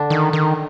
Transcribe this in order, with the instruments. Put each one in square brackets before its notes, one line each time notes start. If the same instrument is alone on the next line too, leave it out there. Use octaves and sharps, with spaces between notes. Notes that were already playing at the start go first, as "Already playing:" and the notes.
Already playing: [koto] D3 D4
[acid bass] D#3
D#3